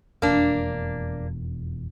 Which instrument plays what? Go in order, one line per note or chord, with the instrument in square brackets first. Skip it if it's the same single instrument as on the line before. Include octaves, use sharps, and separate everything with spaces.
[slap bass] E1 F2 [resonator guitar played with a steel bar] A#3 D4